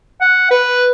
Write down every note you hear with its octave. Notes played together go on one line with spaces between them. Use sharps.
F#5
B4